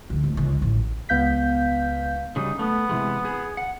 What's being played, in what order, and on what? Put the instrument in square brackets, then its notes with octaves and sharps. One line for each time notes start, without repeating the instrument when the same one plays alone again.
[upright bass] D2
D1
C#2
A1
[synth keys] C#2 B3 F5 G6 B6
[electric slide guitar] C#3 F#3 G3 [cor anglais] D#4
[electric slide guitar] A3 [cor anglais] B3
[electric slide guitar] C3 E3 G#3
G#4
F#5